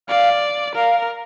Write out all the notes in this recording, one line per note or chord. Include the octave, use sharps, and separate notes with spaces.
D5 F5
A#4 F5